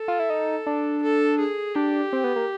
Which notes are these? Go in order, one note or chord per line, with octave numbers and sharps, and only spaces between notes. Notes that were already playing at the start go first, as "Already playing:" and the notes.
Already playing: A4
F4
E4
D#4
D4
A4
G#4
D4 G4
C4
B3
A#3